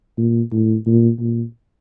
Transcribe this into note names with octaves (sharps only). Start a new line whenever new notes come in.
A#2
A2
A#2
A#2